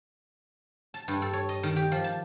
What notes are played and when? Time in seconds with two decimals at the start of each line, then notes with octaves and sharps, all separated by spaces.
0.94 A5
1.08 G2
1.22 A4
1.33 C#5
1.49 D#5
1.63 D#3
1.76 G4
1.92 F3
2.04 A5